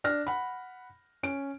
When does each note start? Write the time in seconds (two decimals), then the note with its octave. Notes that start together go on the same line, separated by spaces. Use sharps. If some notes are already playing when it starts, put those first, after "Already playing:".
0.04 D4 F6 A#6
0.27 F#5 B5
1.23 C#4 D7